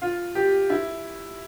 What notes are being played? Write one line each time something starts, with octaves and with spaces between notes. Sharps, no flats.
F4
G4
E4